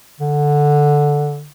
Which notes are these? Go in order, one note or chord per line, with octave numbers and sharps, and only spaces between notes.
D3